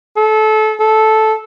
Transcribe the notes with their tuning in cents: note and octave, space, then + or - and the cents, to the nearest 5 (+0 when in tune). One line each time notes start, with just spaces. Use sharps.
A4 -25
A4 -10